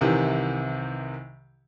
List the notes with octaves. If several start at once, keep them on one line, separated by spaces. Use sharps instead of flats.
C2 C3 D#3 E3